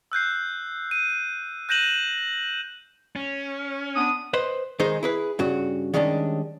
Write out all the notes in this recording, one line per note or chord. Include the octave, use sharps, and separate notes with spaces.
E6 F#6 G6 C7
D#7
F#6 G6 A#6 D#7 E7 F#7
C#4
B3 D4 D#6
B4 C5 D#5
D#3 G#3 D#4 G#4 C5
E4 G#4 B4
G2 C#3 F#4
D#3 G3 G#3 C#4 D4